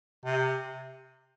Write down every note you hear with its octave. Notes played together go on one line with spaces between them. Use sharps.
C3